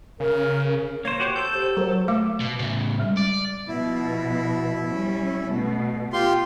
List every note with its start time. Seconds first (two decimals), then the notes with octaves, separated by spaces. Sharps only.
0.20 C#3 A#4
1.05 A#3 C5 C#5
1.20 F#4 G4 C5
1.36 A4 G6
1.53 G4 C5
1.77 F#3 A#4 C5 C#5
2.08 A3 F5 D6
2.40 B2
2.59 A2 C#3
3.00 G3 G#3
3.17 D5
3.68 B2 F3 E4
4.89 G3 C#4
5.50 B2 A3
6.13 F4 G4 C6